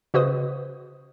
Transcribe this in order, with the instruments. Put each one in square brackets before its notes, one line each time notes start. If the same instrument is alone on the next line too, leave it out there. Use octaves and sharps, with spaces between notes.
[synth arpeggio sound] C#3 F#4 B4 C5 D#5 D#6